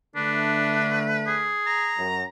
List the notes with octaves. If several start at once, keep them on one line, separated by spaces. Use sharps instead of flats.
D3 A3 D4 B4
G#4
A#5
F#2